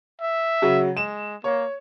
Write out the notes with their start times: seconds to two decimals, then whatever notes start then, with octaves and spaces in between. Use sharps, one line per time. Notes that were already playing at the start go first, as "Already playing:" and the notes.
0.21 E5
0.62 C#3 F#3
0.97 G#3 E7
1.44 A#3 C#5